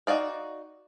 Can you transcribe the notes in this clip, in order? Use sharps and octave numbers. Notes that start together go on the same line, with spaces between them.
D#4 F#4 D5 F5